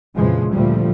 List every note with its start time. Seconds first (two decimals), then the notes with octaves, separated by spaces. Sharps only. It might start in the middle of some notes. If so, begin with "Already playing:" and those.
0.16 F2 A#2 C#3 E3 F3 G#3
0.53 D2 A#2 F3 G3 A3